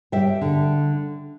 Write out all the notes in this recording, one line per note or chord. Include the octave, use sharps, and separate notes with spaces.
G3 E5 G5
D3